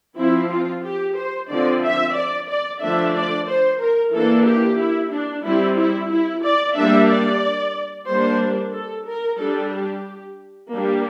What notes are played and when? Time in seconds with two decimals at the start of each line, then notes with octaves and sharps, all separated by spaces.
0.18 F3 C4 E4
0.51 F4
0.85 G4
1.17 C5
1.50 D3 F3 C4 D5
1.83 E5
2.16 D5
2.49 D5
2.82 D3 F3 A3 D4 E5
3.15 D5
3.49 C5
3.81 A#4
4.14 E3 A#3 D4 A4
4.47 G4
4.79 E4
5.12 D4
5.45 G3 C4 E4
5.79 E4
6.11 E4
6.44 D5
6.76 G3 A#3 D4 E5
7.10 D5
8.09 G3 A#3 D4 C5
8.75 A4
9.07 A#4
9.40 G3 D4 A4
9.73 G4
10.71 G3 A#3 D4